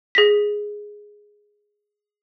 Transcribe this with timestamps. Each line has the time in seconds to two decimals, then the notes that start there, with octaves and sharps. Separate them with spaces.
0.15 G#4 A#6 B6